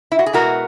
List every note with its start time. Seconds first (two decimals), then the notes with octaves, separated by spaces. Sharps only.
0.12 E4
0.19 F#4
0.26 G#4
0.33 B2 G#3 B3 E4 F#4 A#4